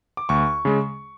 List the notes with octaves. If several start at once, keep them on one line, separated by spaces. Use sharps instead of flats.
D6
D2 C#6
C#3 G#3